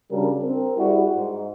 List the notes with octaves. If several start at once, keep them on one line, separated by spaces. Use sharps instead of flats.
C#3 G3 D4 F#4 A#4
C4 A#4
G3 E4 F#4 G#4
G#2